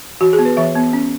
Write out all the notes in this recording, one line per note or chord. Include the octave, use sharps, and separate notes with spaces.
E3 F#4
G#4
B3
B4
E3 E5
B3
C#4